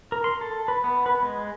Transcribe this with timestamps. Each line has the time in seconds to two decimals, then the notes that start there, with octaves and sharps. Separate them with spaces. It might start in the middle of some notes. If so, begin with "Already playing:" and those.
0.12 A#4
0.24 C6
0.41 A4
0.68 B4
0.84 B3
1.06 B4
1.23 G#3